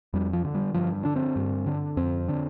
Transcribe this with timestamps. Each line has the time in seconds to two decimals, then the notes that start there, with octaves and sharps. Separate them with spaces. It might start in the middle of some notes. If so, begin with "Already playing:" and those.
0.14 F2 G3
0.33 F3
0.45 D3
0.55 G3
0.74 G2 F3
1.05 D3 D4
1.16 C4
1.36 G2
1.66 D3
1.97 F2 C4
2.28 D3